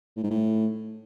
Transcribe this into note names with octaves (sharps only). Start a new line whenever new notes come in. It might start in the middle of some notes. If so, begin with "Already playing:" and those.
A2
G#2
A2